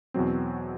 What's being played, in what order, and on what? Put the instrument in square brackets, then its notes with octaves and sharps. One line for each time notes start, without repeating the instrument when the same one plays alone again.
[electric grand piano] E2 B2 F#3 C4